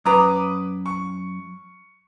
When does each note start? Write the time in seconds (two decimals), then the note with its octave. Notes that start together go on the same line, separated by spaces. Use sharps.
0.06 F#2 B4 A#5 D6 D#6
0.86 C#6